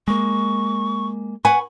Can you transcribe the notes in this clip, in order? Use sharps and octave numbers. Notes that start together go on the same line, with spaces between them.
G#3 A#3 C#6
B4 F#5 G#5 C#6